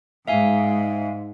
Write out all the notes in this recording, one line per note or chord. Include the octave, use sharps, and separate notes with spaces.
G#2 E5 F5 G#5